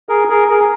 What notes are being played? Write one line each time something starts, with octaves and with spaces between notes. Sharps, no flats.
G#4 A#4
G#4 A#4
G#4 A#4